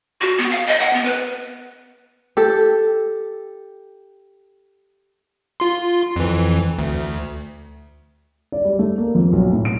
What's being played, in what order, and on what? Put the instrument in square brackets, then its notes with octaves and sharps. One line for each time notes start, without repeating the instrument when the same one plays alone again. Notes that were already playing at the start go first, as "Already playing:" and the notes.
[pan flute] F#4
B3
F5
D#5
F#5
B3
B4
[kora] G4 A4
[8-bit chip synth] F4 C6
F2 E3
D2
[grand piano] D5
G3
A3
A#3
F2
B1
A2
D7